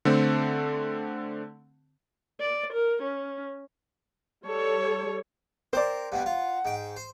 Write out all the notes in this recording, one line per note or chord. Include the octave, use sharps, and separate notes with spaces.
D3 A3 C4
D5
A#4
C#4
G3 A4 C#5
C4 A#4 C5 D5
G2 B2 G3 F#5
F4
G#2 G5
C5